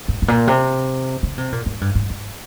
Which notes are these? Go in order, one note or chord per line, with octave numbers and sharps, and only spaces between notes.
G#2
G#2
A#2
C3
C#3
C3
A#2
G#2
G2
G#2
G#2